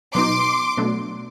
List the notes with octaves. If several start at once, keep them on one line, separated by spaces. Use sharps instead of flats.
B2 F#3 B3 D#4 C6 D6
B2 F#3 A3 D4